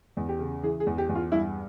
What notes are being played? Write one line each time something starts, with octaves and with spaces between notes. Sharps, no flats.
E2
G4
C#3
E3 G#4
G#4
E2
G4
E2
F4
G2 E4